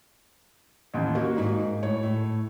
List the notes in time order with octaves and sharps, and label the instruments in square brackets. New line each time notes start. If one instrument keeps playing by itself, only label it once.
[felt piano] A1 D#2
A#3 F#4
[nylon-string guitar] G#2 D#4
[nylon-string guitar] A2 [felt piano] C#5
[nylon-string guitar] A2